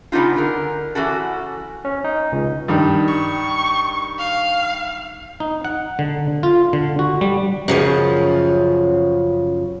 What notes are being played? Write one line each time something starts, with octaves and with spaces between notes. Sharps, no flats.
C#3 B3 D4 D#4 F4
D3 A#4
E3 C#4 F#4 A4
C#4
D#4
C#2
G2 D#3
C#6
F5
D#4
F#5
D3
F4
D3
F#4
G3
F#2 C#3 F3